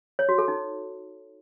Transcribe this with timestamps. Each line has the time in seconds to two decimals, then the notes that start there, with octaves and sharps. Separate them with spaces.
0.19 C#5
0.29 F#4
0.38 A4
0.48 D#4